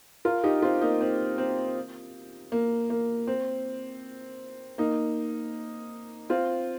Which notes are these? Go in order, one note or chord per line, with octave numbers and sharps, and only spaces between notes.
F4 A#4
D#4 G4
C4 F4
A#3 D#4
C4
C4
A#3
A#3
C4
A#3 D#4
C4 F4